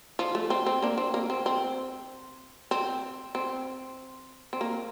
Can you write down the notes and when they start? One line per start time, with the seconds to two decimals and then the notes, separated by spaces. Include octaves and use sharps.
0.19 F3
0.35 A3
0.50 C4
0.66 C4
0.82 A#3 D4
0.98 C4
1.14 A#3
1.30 C4
1.46 C4
2.71 C4
3.35 C4
4.53 C4
4.61 A#3